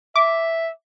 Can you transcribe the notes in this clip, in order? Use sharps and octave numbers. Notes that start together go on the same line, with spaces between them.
E5 D6